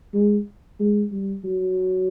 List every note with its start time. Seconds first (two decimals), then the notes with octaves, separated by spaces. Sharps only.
0.13 G#3
0.80 G#3
1.12 G3
1.44 F#3